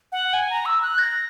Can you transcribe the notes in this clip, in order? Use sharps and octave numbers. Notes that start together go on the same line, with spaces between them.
F#5
G#5
A#5
E6
F#6
A#6